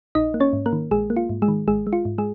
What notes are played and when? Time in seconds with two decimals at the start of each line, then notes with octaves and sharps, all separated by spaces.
0.15 A#1 D#4 D#5
0.34 A#3
0.40 C#4 C#5
0.53 G#2
0.66 A#3 A#4
0.73 D#3
0.91 A#1 G#3 G#4
1.10 A#3
1.17 F4
1.29 G#2
1.42 G#3 G#4
1.48 D#3
1.68 G#1 G#3 G#4
1.87 G#3
1.93 F4
2.05 G#2
2.18 G#3 G#4